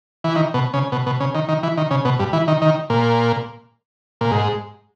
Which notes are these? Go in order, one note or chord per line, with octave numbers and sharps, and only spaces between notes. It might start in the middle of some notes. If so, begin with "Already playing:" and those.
E3
D#3
B2
C#3
B2
B2
C#3
D#3
D#3
E3
D#3
C#3
B2
G2
E3
D#3
D#3
A#2
A#2
G#2